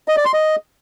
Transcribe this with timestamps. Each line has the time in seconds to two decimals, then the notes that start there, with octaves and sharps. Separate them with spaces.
0.08 D#5
0.17 D5
0.25 C6
0.34 D#5